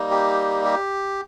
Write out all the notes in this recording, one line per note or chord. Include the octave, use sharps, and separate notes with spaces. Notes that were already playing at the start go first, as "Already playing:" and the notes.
Already playing: G3 A#3 D#4
G4
G4